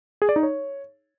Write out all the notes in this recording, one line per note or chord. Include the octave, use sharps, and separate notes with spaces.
G#4
D5
D#4
C#5